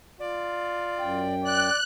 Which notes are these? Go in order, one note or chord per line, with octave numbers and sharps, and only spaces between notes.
F4 D5
F#2 G5
D5 F#6